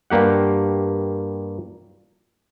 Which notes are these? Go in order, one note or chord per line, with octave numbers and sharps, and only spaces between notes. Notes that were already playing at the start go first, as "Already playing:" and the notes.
G2 A#3 G4 F#5